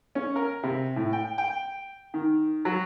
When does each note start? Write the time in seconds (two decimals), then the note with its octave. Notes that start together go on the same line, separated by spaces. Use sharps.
0.15 C#4
0.36 A#4
0.63 C3
0.96 A2
1.13 G5
1.38 G5
2.14 D#3
2.65 F#3